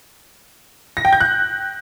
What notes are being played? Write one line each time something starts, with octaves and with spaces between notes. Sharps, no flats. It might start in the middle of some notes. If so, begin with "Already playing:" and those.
A#6
G5
G6
F#6